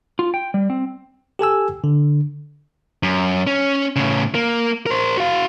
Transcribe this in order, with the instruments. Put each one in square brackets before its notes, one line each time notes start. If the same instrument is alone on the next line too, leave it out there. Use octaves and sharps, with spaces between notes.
[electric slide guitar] F4
G5
G3
C4
[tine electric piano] G4 A4 G#5 E6
D3
[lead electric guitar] F#2
C#4
A2 C#3
A#3
A#4 C5
F#4 F5